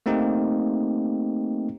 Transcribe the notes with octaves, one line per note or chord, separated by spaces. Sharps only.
A3 A#3 C4 D#4 G4